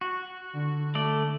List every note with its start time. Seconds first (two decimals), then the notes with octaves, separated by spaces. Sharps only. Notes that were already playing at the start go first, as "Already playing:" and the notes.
0.01 F#4
0.53 D3
0.95 A3 D5